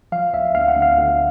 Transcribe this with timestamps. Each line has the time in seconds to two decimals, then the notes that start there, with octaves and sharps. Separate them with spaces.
0.12 F3 F5
0.33 D2 E5
0.55 D2 F5
0.68 F#5
0.76 D2
0.82 F5
0.97 D2